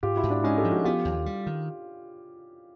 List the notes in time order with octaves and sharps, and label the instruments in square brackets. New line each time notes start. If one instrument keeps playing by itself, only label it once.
[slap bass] G#2 [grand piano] F4 G4
[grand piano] E4 F#4
[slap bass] G#2
[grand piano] D4
[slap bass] G#3 [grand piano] C#4 D#4
[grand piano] G4 A4
[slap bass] F3
[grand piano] F#4 G#4
[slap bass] B3 [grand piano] F4 G4
[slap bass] D#2
G3
D#3